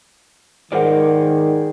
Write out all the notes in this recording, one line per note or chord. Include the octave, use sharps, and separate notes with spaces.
G#2 D#3 G#4 A#4 C5 D5 F#5